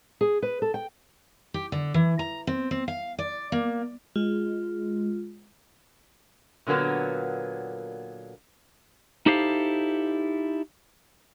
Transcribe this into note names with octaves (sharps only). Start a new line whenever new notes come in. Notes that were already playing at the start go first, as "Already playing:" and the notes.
G#4
B4
A4
G5
G4
D3
E3
A#5
C4
C4
F5
D5
A#3
G#3 F4
A#2 D3 F#3 A#3 B3
D#4 E4 G4 A4 C5 F5